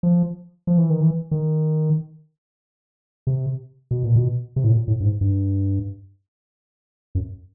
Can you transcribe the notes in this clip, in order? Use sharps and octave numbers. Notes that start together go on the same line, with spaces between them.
F3
F3
E3
D#3
E3
D#3
C3
B2
A#2
B2
C3
A2
A#2
A2
G2
G#2
G2
F#2